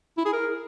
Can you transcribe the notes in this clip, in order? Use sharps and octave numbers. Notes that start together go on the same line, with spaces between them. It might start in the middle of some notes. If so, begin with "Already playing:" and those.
E4
G#4
A#4